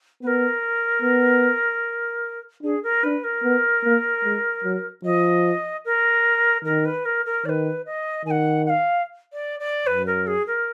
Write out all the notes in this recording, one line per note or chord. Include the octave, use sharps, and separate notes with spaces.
B3 A#4 B4
B3
D4 G#4
A#4
D4 B4
A#4
B3
A#3
G#3
F#3
F3 D#5
A#4
D#3 A#4
B4
A#4
A#4
D#3 B4 D5
D#5
D#3 G#5
F#5
F#5
F5
D5
D5
F#2 B4
A#4
G#4
A#4